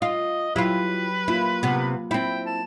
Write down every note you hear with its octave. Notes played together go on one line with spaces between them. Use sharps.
F4 D#5
F#3 E4 F4 G4 B4
A#3 E4 F4
C3 B3
C4 E4 G5
A5